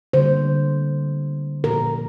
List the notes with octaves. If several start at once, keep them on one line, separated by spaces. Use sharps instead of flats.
D3 G3 A#3 C5
A#2 F3 A#3 A#4